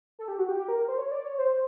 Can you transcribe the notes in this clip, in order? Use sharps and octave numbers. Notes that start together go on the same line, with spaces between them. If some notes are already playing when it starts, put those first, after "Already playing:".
A4
G4
F#4
G4
G4
A#4
A#4
C5
C#5
D5
C#5
C5